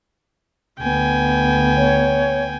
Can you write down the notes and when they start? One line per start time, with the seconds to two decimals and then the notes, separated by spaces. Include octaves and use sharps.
0.81 D2 B3 G5 G#5
1.77 C#5